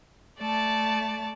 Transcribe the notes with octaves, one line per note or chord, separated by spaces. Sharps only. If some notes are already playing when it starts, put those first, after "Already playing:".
A3 D5 A5